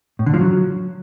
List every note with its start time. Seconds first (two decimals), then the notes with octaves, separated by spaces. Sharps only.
0.19 A2
0.26 D3
0.34 F3
0.41 F#3